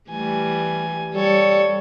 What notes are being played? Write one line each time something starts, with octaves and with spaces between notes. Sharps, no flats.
E3 G3 A3 G#5
G3 A4 C#5